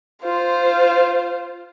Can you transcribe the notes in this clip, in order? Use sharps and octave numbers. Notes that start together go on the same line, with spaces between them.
F4 C5